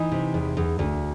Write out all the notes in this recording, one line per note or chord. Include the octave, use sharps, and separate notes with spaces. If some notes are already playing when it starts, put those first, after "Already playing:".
Already playing: E3 D#4
C3
E2
E2
D2